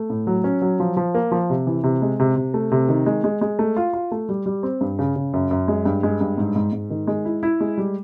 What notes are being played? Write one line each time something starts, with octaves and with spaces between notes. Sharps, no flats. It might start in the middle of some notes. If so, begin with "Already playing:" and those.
Already playing: A3
A2
F#3
C#4
F#3
F3
F3
A#3
F3
C3
E3
C3
G#3
C3
C3
A3
C3
D#3
G#3
G#3
G#3
A3
F4
F4
A3
G3
G3
C4
G2
C#3
C#3
F#2
F#2
G#3
G2
G#3
G2
G#2
G#2
G#2
D#3
G#3
E4
E4
G#3
G3